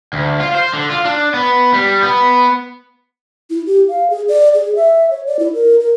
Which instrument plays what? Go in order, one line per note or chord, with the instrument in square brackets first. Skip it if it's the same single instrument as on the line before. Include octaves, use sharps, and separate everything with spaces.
[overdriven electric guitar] D2
F4
C5
D3
F4
D4
B3
G3
B3
[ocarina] E4
G4
F5
G#4
D5
G#4
E5
C#5
D5
E4
A#4
A#4